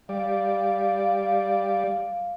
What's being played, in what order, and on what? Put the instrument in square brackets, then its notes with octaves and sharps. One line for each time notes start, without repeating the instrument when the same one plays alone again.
[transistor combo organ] G3 D5 [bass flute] F5